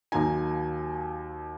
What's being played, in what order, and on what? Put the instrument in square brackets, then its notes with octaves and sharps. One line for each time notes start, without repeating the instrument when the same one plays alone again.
[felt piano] D#2 D#3 F#3 A#3 D#4 G#5